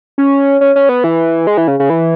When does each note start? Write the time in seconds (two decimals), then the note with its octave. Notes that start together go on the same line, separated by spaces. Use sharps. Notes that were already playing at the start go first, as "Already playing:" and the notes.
0.18 C#4
0.61 C#4
0.76 C#4
0.89 B3
1.04 E3
1.47 G#3
1.57 E3
1.68 C#3
1.80 C#3
1.90 E3